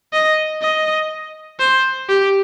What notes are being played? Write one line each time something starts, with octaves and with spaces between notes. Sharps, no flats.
D#5
D#5
C5
G4